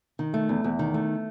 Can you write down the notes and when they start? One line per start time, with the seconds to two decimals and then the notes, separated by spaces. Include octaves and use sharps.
0.19 D#3
0.34 A3
0.49 E2
0.64 E2
0.79 D#3
0.94 A3